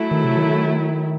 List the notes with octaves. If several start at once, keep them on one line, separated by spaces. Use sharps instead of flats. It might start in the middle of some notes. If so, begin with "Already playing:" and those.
Already playing: F#3 A3 E4
D#3
C3
D#3